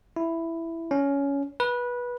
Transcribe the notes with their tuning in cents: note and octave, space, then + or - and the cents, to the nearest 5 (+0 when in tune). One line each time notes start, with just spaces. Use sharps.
E4 +5
C#4 +15
B4 -20